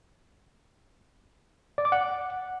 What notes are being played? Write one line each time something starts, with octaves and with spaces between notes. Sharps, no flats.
D5
D6
F#5